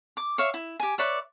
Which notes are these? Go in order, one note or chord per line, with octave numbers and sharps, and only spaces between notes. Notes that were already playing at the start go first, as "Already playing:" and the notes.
D6
C#5 E5 F5
E4
G4 G#5
B4 C#5 D5 E5